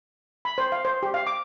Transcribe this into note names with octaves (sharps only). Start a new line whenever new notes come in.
B5
C5
F5
C5
G4
F5
D6